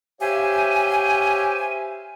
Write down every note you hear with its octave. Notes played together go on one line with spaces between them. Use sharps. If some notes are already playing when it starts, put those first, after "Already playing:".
G4 C5 C#5 E5 F5 G#5